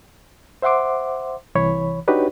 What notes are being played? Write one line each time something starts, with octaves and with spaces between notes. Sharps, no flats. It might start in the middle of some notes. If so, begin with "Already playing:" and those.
C5 E5 F#5 C6 D6
C2 E3 C#5 B5
D4 D#4 F#4 G4 B4 C#5